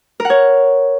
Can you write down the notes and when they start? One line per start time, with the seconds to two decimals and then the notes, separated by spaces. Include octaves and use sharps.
0.20 A#4
0.25 F#5
0.30 C#5